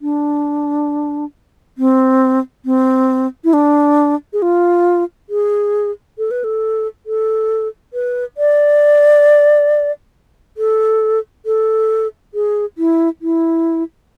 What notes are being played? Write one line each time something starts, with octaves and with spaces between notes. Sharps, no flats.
D4
C4
C4
E4
D4
G#4
F4
G#4
A4
B4
A4
A4
B4
D5
A4
A4
G#4
E4
E4